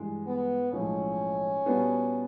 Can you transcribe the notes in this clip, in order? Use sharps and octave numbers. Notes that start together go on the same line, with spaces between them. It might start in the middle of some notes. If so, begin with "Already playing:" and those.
Already playing: G2 E3 G#3
B3
B1 A2 F3 G#3 C#4
A#2 G3 B3 D4 F#4